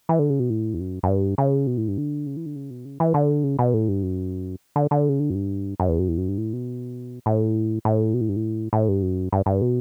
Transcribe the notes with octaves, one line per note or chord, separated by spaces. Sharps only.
E3
D3
C#3
B2
A2
E2
F#2
F#2
G2
C#3
B2
A2
G2
D3
C#3
E3
D3
C#3
B2
C#3
E3
D3
C#3
B2
A2
G2
F#2
D3
D3
C#3
D3
F#2
G2
F#2
E2
F#2
E2
F#2
G2
A2
B2
A2
A2
B2
A2
G2
A2
A2
G2
F#2
G2
G2
B2